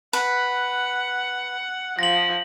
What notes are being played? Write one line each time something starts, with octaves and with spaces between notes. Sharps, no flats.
B4 F#5
F3 A#6 F#7